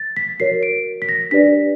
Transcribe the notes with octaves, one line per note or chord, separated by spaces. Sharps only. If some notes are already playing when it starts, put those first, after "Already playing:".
Already playing: A6
B6
F#4 A#4 C#5 C7
D7
B6
A#6
D4 G4 B4 D5 B6